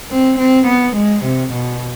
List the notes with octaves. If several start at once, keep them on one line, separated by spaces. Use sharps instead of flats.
C4
C4
B3
G#3
C3
B2